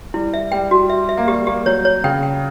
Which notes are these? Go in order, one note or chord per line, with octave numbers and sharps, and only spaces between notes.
G3 E4
E5
G3 G5
F#4
E5
E5
A#3
G3 G4
A#3 G4
F#3 C#5
C#5
C#3 G5
G5